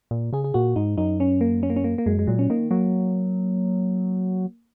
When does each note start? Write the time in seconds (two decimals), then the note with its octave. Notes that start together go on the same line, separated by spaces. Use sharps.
0.11 A#2
0.33 C#3 G#4
0.44 G#4
0.54 A#2 F#4
0.76 G#2 D#4
0.98 F#2 D#4
1.20 C#4
1.41 A#3
1.63 C#4
1.70 A#3
1.76 C#4
1.84 A#3
1.98 A#3
2.06 F#2 G#3
2.19 G#3
2.27 A#2 F#3
2.39 C#4
2.50 D#3 A#3
2.71 F#3 A#3